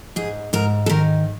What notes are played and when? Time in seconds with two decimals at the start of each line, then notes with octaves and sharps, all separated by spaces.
0.16 G#2 G#4
0.53 G#2 A#4
0.86 A4
0.89 D#3 A#4